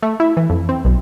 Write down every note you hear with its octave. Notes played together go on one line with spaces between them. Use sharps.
A3
E4
E3
F2
C4
B1